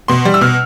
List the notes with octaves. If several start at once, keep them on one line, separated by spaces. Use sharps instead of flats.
B2 C6
G3
E6
B2 F6